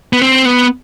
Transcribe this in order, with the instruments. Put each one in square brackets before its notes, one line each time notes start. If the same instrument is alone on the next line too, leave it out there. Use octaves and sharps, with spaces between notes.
[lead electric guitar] B3
C4
B3